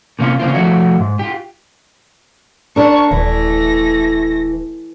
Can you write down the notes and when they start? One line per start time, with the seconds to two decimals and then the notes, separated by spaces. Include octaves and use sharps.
0.19 C3 A#3 C#4 F4
0.40 C#3 A#3 C4 F4
0.54 F3 A3 F#4 C#5
0.99 G#2
1.19 F4 G4
2.76 D4 A#4 C#6
3.11 D#1 E3 A3 A#6